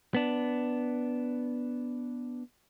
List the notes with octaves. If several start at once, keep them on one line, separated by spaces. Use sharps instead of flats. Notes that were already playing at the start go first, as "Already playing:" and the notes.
B3 D4